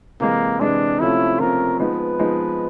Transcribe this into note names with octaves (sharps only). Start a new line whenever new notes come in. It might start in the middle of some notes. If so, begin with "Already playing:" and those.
C3 E3 G#3 A#3
C3 E3 G#3 D4
C3 F3 A3 C#4 E4 F4
C3 F3 A3 C#4 F4 A#4
F3 G#3 B3 D#4 B4
F3 G#3 B3 D#4